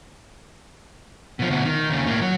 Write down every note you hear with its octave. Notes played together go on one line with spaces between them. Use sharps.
B2 F3
D2 B2
D#3
D#2 C#3
A2 A#3
F#3